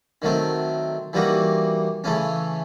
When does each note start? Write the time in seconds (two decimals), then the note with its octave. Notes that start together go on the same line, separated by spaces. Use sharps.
0.22 D#3 F#3 A3 C4
1.13 E3 G3 A#3 D#4 F#4
2.04 C#3 E3 A3 C#4